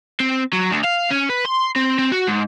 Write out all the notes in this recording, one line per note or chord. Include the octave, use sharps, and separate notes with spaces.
C4
F#3
D2
F5
C#4
B4
C6
C4
C4
F#4
G#2